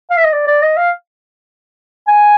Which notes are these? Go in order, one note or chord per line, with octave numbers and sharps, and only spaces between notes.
F5
E5
D#5
D5
D5
D#5
F5
G#5